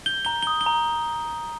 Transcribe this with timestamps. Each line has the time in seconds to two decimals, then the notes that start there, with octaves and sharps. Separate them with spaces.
0.06 G6 G7
0.25 A#5 G7
0.43 G7
0.47 D#6
0.61 G7
0.66 A#5